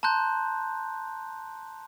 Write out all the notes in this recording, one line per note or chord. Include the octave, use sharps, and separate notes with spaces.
A5 A#5 C6 F#6 G6